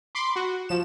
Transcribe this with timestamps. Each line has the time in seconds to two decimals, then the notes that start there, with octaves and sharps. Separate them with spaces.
0.15 B5 C6 D6
0.36 F#4
0.69 F3 E7